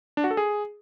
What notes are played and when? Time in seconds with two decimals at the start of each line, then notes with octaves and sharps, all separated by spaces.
0.17 D4
0.24 F#4
0.31 A4
0.37 G#4